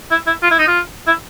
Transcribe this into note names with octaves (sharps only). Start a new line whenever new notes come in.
E4
E4
F4
E4
D#4
F4
E4